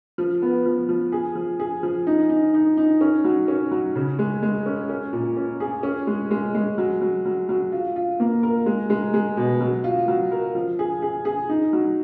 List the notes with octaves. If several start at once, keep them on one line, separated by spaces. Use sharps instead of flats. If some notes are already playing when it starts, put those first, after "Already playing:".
F3
B3
F3
F3
G#4
F3
G#4
F3
D#4
D#4
D#4
D#4
C#4
F#3
C#4
F#3
C#3
G#3
G#3
C#4
C#4
A#2
C#4
G#4
C#4
G#3
G#3
G#3
F#3
F#3
F#3
F#3
F4
F4
A#3
A#4
G#3
G#3
G#3
B2
F#3
F4
F#3
A#4
F3
G#4
G#4
G#4
D#4
F#3